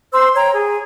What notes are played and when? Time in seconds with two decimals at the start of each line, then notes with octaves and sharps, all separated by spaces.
0.12 C5 C6 E6
0.34 C#5 G5 A#5
0.53 G#4